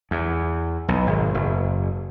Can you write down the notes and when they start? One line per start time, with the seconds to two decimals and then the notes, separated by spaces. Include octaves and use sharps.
0.11 E2
0.88 B1
1.07 G#1
1.34 F#1